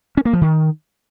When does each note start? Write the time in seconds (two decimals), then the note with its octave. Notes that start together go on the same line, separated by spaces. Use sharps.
0.17 C#4
0.25 A#3
0.33 F3
0.41 D#3